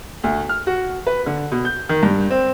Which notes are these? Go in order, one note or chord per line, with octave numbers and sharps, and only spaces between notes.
D2
F6
F#4
B4
D3
B2
G6
D#3
G2
C4